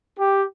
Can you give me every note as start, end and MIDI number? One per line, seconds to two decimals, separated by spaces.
0.19 0.42 67